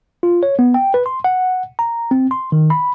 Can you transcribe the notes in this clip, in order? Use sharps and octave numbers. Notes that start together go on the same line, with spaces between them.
F4
C#5
B3
G5
B4
C6
F#5
A#5
C4
C6
D#3
B5